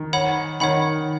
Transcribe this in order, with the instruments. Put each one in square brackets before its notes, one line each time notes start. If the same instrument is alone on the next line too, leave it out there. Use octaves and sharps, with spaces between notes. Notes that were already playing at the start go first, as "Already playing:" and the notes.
Already playing: [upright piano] D#3
[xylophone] C#5 F#5 B5
[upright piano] D#3 [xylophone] C#5 F#5 B5